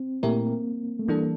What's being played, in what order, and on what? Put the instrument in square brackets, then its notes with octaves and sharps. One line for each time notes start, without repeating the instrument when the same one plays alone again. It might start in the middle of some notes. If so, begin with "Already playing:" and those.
Already playing: [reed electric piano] C4
[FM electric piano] A#2 A3 E4 G4 A#4 [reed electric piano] A#3
[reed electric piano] A3
[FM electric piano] E3 G3 D4 A4 [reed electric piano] A#3